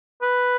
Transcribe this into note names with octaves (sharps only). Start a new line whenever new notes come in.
B4